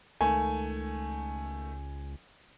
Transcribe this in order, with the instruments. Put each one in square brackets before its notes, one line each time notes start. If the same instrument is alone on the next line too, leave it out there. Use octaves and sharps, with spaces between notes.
[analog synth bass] C#2 [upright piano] D#3 A3 [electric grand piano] G#5